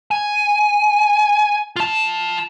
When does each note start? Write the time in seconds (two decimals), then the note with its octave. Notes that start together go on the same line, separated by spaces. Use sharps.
0.11 G#5
1.76 F4 A5